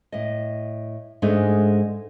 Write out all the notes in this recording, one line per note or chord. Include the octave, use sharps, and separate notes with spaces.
A2 D#5
G#2 G#3 A3 D4 D#4